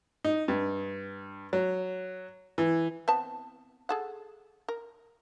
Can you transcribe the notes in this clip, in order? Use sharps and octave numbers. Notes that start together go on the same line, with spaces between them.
D#4
G2
F#3
E3
B3 C4 A5
G#4 A4 F#5
A#4